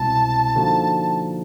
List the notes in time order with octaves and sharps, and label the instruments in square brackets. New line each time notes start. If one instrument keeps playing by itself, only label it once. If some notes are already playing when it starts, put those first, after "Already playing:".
Already playing: [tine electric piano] C2 B2 G#3 C4 E4 [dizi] A5
[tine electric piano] D3 F3 A#3 D#4 F#4